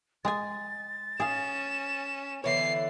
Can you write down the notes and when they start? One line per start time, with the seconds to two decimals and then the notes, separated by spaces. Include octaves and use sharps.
0.25 G#3 G#4 G#5 A6
1.20 C#4 G#4 F5 E7
2.44 D3 E3 B3 C#5 C7